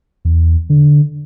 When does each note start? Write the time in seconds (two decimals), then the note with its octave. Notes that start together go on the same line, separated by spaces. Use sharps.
0.25 E2
0.70 D3